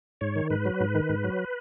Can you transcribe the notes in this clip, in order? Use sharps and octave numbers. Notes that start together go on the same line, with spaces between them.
G#2 C#5
D#3
G#2 B4
F#3
G#2
D#3
G#2
F#3